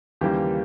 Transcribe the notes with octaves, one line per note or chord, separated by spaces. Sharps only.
D#2 C#3 E3 G3 A#3 G4